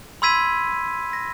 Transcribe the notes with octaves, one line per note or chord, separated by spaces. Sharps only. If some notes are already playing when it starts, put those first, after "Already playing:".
B5 C6 E6 G#6 B6 D#7
A#6